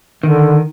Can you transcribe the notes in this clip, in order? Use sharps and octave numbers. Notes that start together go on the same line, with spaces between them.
D3 D#3